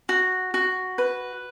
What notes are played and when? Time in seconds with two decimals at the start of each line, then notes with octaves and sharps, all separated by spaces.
0.09 F#4
0.54 F#4
0.98 B4